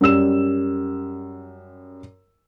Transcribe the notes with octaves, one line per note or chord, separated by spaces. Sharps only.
F#2 G3 E6 E7